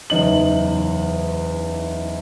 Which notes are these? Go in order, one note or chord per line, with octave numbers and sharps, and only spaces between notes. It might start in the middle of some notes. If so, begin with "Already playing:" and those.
F#1 E2 D#4 F#7